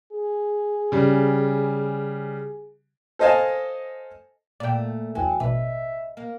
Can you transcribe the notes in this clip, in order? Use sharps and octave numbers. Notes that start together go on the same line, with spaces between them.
G#4
C#3 G3
A4 C5 D#5 F5 G#5 A5
A#2 A3 D5 G5
E2 E3 F#3 G5 G#5
A1 B2 D4 B4 D#5 E5
A#3